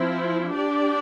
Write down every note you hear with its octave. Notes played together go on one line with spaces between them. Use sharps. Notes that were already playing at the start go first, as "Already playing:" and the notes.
Already playing: F3 C4 E4
D4 G4 D5